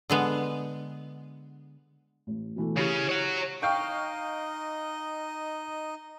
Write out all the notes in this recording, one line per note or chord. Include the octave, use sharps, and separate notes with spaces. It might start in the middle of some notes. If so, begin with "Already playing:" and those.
D3 G#3 B3
A1
B2 E3 A3
C#3 C#4 E4 G4
C#5 F#5
D#4 D#5 F5 G5 C#6